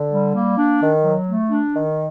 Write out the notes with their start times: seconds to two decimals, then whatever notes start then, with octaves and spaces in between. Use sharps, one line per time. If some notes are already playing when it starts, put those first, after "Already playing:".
Already playing: D3
0.12 G3
0.35 A#3
0.58 D4
0.81 D#3
1.04 F#3
1.28 A3
1.50 D4
1.74 D#3